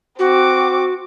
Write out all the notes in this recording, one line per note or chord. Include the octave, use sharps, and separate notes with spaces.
C4 F#4 D6